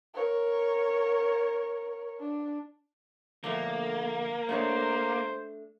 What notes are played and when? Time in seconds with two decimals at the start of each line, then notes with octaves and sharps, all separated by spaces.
0.14 A#4 C#5
2.20 D4
3.44 D3 F3 A3 A#3
4.49 A3 D4 C5 C#5